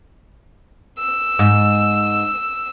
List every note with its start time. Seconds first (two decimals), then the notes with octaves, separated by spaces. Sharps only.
0.99 E6
1.39 G#2